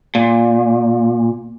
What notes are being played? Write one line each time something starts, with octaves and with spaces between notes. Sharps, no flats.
A#2